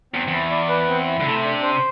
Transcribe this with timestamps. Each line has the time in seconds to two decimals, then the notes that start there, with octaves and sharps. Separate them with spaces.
0.13 E2 C4
0.28 E2 E4
0.51 D5
0.69 B4
0.88 C4
1.07 E4
1.21 D3
1.26 C3 A3
1.44 D4
1.63 C5